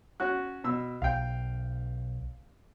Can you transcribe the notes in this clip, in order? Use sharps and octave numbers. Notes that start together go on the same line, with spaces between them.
C#4 F#4 F#6
B2 E6
B1 F5 G5